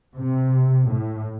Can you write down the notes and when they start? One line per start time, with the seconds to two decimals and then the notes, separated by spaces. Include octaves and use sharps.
0.16 C3
0.89 A2